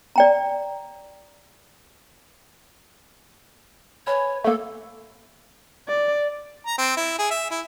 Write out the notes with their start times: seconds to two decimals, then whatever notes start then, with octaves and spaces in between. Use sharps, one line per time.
0.16 D5 G5 A#5
4.07 B4 C#5 G#5
4.44 A3 A#3 A4
5.88 D5
6.66 A#5
6.78 C4
6.97 E4
7.19 G#4
7.31 E5
7.51 E4